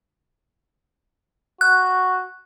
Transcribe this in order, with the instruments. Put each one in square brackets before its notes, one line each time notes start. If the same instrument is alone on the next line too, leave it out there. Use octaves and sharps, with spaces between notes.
[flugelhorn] F#4 [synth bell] F#6